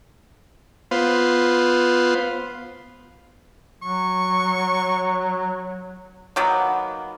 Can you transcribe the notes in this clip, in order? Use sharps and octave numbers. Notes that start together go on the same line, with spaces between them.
B3 F4 C5
F#3 C#6
D#3 F#3 A#3 B3